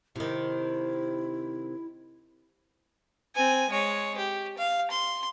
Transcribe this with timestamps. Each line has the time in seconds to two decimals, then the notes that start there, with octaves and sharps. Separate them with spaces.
0.16 C3 D#3 E4
3.36 C4 G#5
3.70 G#3 C#5
4.17 G4
4.58 F5
4.91 C6